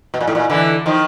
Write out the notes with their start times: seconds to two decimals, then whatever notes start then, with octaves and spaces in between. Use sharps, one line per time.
0.14 B2
0.21 A#2
0.28 A2
0.35 A#2
0.50 D3 E3
0.86 D#3 F3